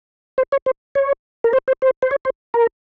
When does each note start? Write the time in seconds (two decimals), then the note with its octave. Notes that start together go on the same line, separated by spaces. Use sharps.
0.38 C5
0.52 C#5
0.66 C5
0.95 C#5
1.44 A#4
1.53 C5
1.68 C5
1.82 C5
2.02 C5
2.11 C#5
2.25 C5
2.54 A#4